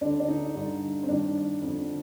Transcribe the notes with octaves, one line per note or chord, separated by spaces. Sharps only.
D2 D3 D4
D4
D#4
G2 D3
C4
G2 D#3 D4
F2 D3